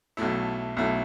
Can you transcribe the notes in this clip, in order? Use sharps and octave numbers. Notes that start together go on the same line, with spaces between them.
B1 B2 A3 E4
B1 B2 A3 E4